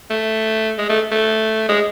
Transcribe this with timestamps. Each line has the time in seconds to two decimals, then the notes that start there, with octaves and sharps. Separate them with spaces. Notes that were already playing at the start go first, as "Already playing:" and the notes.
0.10 A3
0.78 G#3
0.89 A3
1.12 A3
1.69 G#3